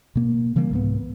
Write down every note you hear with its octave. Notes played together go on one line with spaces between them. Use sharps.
B2 A#3
C#3 E3 G3 A#3
C2 G#2 B3